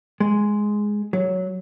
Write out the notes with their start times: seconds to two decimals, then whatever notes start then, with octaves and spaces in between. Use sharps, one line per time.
0.20 G#3
1.13 F#3